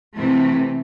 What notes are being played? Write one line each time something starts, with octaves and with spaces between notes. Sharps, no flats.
C3 E3 A3